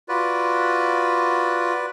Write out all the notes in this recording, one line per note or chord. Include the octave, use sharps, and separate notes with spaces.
F4 F#4 B4 D5